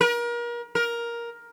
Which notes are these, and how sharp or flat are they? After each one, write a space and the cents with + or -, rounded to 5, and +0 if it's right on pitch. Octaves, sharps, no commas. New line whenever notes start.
A#4 +35
A#4 +10